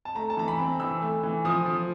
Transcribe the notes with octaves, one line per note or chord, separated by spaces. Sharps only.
A5
A3 A#5
A5
E3 A#5
B5
C4
E3 E6
A3
E3
F3 D#6
F3